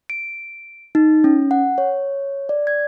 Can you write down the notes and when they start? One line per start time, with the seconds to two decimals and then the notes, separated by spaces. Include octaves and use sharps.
0.10 D7
0.95 D#4
1.24 C#4
1.51 F#5
1.78 C#5
2.49 D5
2.67 G#6